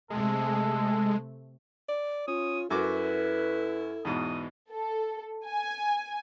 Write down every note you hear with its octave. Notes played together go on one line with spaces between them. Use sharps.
C3 G#3 A3 A4
D5
C#4 F4 D#6
F#2 E4 F#4 A4 B4 D6
E2 G#2 B2 D#6
A4
G#5